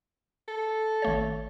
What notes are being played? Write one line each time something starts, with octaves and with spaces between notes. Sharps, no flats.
A4
G#1 A3 C#5